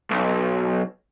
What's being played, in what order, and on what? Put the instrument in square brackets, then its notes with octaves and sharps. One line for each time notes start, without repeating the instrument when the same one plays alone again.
[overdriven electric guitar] B1